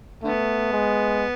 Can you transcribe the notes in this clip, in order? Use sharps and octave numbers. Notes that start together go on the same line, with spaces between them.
D3 A3 B3
G#3